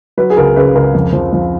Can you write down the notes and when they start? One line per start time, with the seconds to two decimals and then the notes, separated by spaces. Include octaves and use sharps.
0.18 F#3 B4
0.30 G#4
0.37 C#2 A#4
0.56 C#3 B4
0.75 C#2 A#4
0.94 F2
1.13 F3
1.33 F3